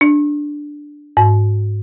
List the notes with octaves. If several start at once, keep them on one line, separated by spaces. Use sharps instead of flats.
D4
G#2